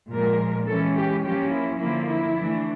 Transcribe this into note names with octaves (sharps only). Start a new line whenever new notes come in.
A#2 F3 G#3 A#4
E3 G#3 C#4 A4
G4
F3 A#3 C#4 G4
E4
D3 F3 A#3 E4
E4
E3 A3 D4